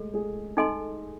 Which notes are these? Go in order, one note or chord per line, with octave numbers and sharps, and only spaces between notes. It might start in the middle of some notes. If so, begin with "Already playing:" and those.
Already playing: G#3 A3 G#4 A4
G#3 G#4
D#4 A4 D#5 G#5 C6